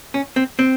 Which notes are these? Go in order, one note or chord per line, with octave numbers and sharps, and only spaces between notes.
C#4
C4
C4